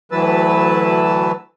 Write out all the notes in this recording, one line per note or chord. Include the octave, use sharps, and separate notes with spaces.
D2 E3 F#3 B4 A5 E6